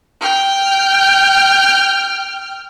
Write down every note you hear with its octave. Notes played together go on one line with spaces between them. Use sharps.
G5 F6